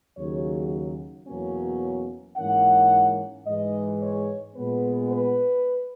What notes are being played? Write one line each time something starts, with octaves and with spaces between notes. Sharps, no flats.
D#2 C#3 F#3 C#5
E2 B2 F#3 A#3 C#4
G#2 E3 A#3 C#4 F#5
G#2 E3 G#3 D#5
C#5
A#2 G#3 B3 B4
B4